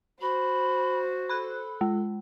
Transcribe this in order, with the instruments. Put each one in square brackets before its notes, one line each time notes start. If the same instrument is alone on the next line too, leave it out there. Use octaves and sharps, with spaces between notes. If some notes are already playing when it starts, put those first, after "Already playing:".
[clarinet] F#4 [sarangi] C5 [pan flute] B5
[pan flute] A4 [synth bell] B5 F#6
[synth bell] G#3